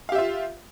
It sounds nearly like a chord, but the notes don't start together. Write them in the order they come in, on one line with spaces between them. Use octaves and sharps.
F5 G4 E5 F4